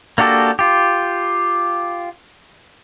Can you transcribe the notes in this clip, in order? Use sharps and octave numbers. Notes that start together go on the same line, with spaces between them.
A#3 D4 F#4 G4 A4
F4 G4